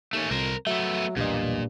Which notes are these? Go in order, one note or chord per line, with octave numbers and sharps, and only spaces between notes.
D#2 A3 C#4
C2 F2 A#4 C5
F#3 A3 B3 E5
B1 E2 G2 A#2 D#5